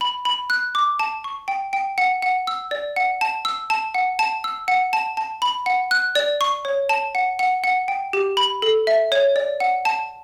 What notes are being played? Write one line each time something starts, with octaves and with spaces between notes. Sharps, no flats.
B5
B5
F#6
D6
A5
C#6
G5
G5
F#5
F#5
E6
D5
F#5
A5
E6
A5
F#5
A5
E6
F#5
A5
A5
B5
F#5
F#6
D5
C#6
C#5
A5
F#5
F#5
F#5
G5
G4
B5
A4
E5
C#5
D5
F#5
A5